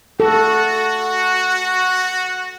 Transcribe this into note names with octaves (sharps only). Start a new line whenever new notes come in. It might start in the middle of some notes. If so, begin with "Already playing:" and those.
F#4 A4